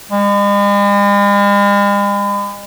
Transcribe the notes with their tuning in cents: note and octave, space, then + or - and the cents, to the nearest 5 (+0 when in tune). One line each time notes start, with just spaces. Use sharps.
G#3 -45